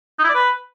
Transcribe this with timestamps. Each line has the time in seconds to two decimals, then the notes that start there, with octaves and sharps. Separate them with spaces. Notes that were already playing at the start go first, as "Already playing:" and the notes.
0.19 D#4
0.24 E4
0.29 D5
0.34 B4